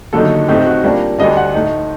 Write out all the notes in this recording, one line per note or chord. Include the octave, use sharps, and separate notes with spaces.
D#2 D3 F#3 A3 D#4 A4
A2 A3 C4 D#4 G4
F#4
A#2 G3 A#3 D4
D2 D3 G3 D4 D#5
F#5
A2 A3 D#4